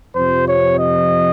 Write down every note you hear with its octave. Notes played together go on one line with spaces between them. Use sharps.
F2 C3 F3 C5
C#5
D#5